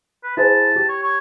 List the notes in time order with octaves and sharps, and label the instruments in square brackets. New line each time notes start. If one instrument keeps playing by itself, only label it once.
[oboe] B4
[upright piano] E4 G#4 C5 [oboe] A5
[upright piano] G4
[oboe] C#5
C#5